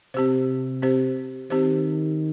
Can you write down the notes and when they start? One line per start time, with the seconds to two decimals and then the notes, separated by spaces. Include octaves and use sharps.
0.14 C3 C4 G4 C5
0.82 C4 G4 C5
1.50 D#3 C4 G4 C5